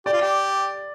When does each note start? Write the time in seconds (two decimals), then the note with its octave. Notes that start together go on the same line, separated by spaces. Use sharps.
0.06 G4 D5
0.13 F4
0.21 G4